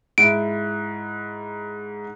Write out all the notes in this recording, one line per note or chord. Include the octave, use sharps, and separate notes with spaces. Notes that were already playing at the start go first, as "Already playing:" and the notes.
G#2 E4 D7